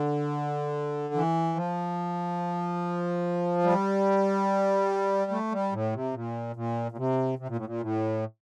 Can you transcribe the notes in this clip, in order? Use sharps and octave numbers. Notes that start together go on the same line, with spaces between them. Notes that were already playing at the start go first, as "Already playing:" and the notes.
Already playing: D3
E3
F3
G3
A3
G3
A2
C3
A#2
A#2
A#2
C3
C3
A#2
A2
A#2
A2